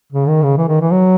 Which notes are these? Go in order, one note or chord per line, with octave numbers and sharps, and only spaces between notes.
C#3
D#3
C#3
E3
D#3
E3
F#3